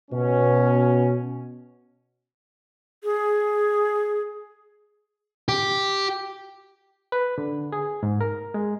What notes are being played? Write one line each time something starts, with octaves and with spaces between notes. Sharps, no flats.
B2 C#4
G#4
G4
B4
D3
G#4
G#2
A#4
G#3